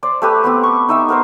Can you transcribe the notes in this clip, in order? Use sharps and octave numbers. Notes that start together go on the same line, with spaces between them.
C5 D5
A3 G4 B4
B3 C4 G4
C#6
D#4 E5 G5
B3 A#4 C5